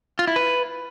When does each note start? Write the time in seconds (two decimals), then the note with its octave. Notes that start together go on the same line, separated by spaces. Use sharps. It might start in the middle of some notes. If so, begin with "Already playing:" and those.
0.19 F4
0.27 E4
0.36 B4